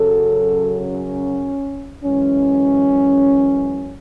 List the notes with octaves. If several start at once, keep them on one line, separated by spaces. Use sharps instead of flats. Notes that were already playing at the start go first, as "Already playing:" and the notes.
Already playing: F#2 C#3 F#3 A4
C#4
F#2 E3 G#3 C#4